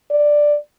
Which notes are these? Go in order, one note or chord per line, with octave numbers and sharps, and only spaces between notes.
D5